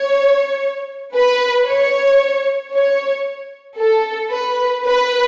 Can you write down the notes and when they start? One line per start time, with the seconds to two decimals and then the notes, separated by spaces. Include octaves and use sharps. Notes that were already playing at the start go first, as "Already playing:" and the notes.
Already playing: C#5
1.15 B4
1.67 C#5
2.73 C#5
3.78 A4
4.31 B4
4.85 B4